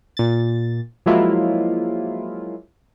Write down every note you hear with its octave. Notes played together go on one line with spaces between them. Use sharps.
A#2 A6
F3 F#3 G#3 A#3 E4 F4